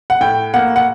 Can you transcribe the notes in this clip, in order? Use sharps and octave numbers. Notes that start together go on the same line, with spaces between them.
F#5
A2 G5
A#3 F#5
F#5